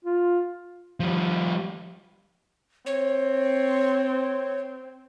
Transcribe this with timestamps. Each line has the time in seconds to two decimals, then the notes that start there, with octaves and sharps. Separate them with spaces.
0.05 F4
1.00 F3 G3
2.86 C4 C#5